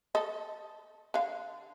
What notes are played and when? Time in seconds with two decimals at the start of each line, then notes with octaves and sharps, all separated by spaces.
0.15 A4 D#5
1.14 D3 F5